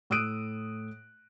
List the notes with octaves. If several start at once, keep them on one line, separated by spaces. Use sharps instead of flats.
A2 D#6 E6 F#6 D7 D#7